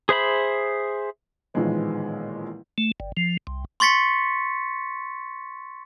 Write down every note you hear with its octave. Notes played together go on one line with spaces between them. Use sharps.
G#4 C5 E5 B5
A1 A#2 D#3 F3 G#3 B3
A3
G1
F3
C2
C6 C#6 A6 B6 C#7